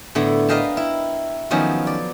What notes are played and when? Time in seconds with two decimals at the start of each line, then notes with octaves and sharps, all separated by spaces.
0.15 A2 D3 B3 E4
0.48 A#4 B4 D#5 F5 G5 A5
0.77 E4
1.51 D#3 F3 F#3 B3 C#4
1.87 D5